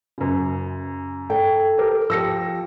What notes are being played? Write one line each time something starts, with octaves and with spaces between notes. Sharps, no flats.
F#2 C#3
A4 G5
G4 A#4
F3 G4 E6 A#6 C#7